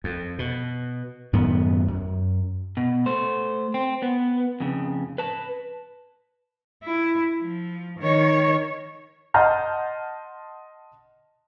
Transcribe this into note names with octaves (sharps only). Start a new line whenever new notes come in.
F2
B2
F#2 A2 D#3 B3
F#2
B2
A3 C5
C4
B3
F2 C#3
B4 A5
E4
F3
D#3 C#5
D#5 F#5 A5 C6 F6 G6